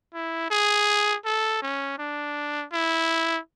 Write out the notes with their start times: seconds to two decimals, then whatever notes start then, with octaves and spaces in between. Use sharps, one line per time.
0.14 E4
0.50 G#4
1.25 A4
1.62 C#4
1.99 D4
2.73 E4